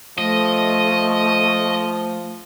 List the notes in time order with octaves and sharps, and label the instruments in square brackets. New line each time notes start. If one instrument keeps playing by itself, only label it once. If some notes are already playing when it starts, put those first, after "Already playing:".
[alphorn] F3 [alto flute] A3 [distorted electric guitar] D#5